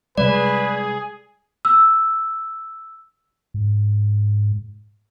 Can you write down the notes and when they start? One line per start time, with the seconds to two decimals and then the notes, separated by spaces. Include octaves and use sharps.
0.18 C3 G3 G#3 G#4 B4 D5
1.65 E6
3.54 G#2